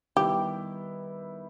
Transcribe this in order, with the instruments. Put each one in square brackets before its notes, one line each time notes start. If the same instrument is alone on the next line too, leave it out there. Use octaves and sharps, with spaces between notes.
[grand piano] D#3 G3 B3 E4 [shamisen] G4